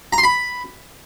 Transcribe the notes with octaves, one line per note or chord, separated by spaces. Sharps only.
A#5
C6
B5